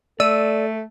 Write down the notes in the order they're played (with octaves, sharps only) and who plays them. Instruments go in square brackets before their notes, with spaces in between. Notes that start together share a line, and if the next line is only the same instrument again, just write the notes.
[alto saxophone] A3 [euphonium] A4 [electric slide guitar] D5 [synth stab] E6 D#7